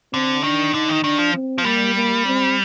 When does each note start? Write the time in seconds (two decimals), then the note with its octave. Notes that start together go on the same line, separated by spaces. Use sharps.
0.13 D3 C4
0.43 D#3 D4
0.74 D3 D#4
0.89 D#3
1.04 D#3 D4
1.18 F3
1.34 C4
1.58 F3
1.64 G3 A#3
1.95 A#3
2.25 C4